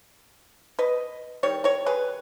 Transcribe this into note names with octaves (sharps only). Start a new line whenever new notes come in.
B4 D#5
D#3 G3 C#5
A#4 C#5
G#4 B4